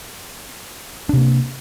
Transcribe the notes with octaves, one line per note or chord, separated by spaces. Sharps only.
C3 A#3 D4